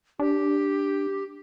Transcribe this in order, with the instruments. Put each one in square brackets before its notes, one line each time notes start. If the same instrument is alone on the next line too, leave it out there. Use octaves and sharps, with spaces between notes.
[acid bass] D4 [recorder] G4